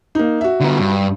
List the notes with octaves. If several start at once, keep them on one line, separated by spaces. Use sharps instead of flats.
A#3 D#4
F#4 E5
D3 B3
G2